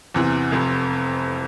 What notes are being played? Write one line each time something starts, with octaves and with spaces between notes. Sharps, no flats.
E2 C3 E3
F1 F2 C3